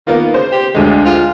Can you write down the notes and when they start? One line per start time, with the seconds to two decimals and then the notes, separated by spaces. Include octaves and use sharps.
0.07 D#3 A#3 B3 F4
0.34 C#3 C5
0.52 G4
0.75 D2 D3 F#3 G#3
1.05 F4